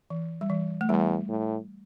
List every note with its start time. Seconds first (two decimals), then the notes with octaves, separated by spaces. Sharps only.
0.10 E3
0.41 G3
0.50 E3
0.81 A3
0.89 E2 G3
1.29 A2